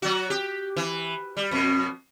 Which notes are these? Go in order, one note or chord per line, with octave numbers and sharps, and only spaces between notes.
F#3 F#4
G4
E3
G3
F2 B2